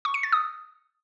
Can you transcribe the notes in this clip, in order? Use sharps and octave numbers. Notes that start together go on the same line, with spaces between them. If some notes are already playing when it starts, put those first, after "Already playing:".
C#6
C#7
A6
D#6